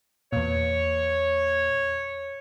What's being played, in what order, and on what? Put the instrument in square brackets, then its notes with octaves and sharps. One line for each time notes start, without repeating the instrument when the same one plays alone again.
[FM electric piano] E2 A#2 [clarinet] C#5